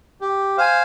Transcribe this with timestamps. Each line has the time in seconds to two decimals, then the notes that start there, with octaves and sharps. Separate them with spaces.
0.21 G4
0.58 C5 F5 G#5